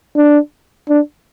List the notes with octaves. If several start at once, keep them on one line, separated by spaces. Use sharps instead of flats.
D4
D4